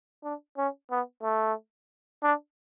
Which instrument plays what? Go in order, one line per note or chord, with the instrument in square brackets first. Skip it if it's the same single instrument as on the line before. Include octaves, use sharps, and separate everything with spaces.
[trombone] D4
C#4
B3
A3
D4